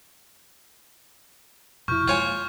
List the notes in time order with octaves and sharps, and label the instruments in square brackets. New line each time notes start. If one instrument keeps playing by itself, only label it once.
[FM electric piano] F2 E4 [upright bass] B2 [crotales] C#6 F6 G6
[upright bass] G#3 A#3 [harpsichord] F4 C#5 G#5